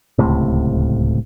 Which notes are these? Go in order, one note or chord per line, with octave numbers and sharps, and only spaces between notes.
D1 C#2 A2 C3